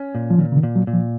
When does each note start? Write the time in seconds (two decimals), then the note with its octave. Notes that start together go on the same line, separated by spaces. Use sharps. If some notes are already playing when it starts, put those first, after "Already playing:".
Already playing: C#4
0.15 A#2
0.30 F3
0.38 A#2 D#3
0.52 C#3
0.57 D#3
0.63 A#2
0.76 F#3
0.87 A#2
0.94 F3